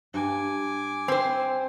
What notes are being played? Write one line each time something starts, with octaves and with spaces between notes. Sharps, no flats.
G2 G#5 D6
C4 C5